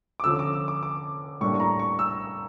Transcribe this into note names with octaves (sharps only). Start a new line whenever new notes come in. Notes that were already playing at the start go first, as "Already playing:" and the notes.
D6
D3 F3 C#4 E6
D6
E6
D6
D6
A2 G3 A#3 D4 C#6
C#6
A#5
C#6
E6